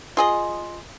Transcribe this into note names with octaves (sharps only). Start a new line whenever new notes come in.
F4 G#4 D#5